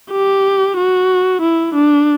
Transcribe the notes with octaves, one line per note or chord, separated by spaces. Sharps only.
G4
F#4
E4
D4